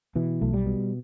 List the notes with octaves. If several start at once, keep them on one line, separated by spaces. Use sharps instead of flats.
B2 E3
B1 A3
G3
B2